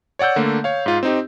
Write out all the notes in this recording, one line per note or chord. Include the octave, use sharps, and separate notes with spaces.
C#5 D5 F#5 E6 G6
D3 A3 A#3
C#5 F5
G#2 F4
C4 D#4 G4